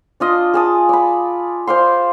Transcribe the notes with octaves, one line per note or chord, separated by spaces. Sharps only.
D4 F4 D#5
G#4 A5 D#6
D5 B5
C5 D5 F5 C6